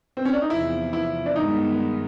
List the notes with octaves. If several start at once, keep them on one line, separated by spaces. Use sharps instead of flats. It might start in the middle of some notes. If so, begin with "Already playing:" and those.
C4
C#4
D4
D#4
E2 C3 F3 E4
E4
D4
G2 D#3 G#3 B3 D#4